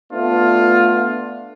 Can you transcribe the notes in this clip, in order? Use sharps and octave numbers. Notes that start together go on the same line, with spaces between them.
A3 B3 D4 F4